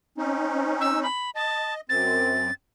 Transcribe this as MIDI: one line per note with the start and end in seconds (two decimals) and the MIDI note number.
0.18 1.07 60
0.18 1.07 61
0.18 1.07 63
0.81 1.00 88
1.03 1.30 83
1.35 1.81 75
1.35 1.74 81
1.89 2.51 42
1.89 2.51 60
1.89 2.53 93